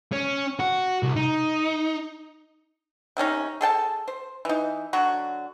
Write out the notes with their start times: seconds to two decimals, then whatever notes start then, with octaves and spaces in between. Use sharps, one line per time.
0.12 C#4
0.59 F#4
1.03 C2
1.16 D#4
3.17 C3 D#3 C#4 D#4
3.61 G#4 A4 G5 A5
4.08 C5
4.45 E3 D#4
4.93 D3 F#3 F#4